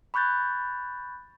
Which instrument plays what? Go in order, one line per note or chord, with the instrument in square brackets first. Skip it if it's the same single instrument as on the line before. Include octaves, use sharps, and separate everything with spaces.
[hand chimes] B5 C#6 F#6 G6 A6